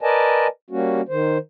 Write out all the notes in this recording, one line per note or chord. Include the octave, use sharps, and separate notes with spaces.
A#4 B4 D5 D#5 G#5 A5
G3 A#3 C#4 F#4
D#3 C5